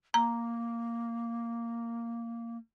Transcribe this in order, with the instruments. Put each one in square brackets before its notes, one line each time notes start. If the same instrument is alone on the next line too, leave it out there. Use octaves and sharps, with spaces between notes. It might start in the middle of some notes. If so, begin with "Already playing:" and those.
[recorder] A#3 [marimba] A#5